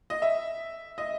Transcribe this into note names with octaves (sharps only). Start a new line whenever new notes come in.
D#5
E5
D#5